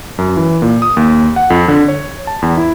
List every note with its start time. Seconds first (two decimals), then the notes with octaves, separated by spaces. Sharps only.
0.18 F#2
0.37 E3
0.62 A#2
0.82 D#6
0.97 D#2
1.36 F#5
1.50 F2
1.68 D3
1.88 C#5
2.27 A5
2.42 E2
2.57 E4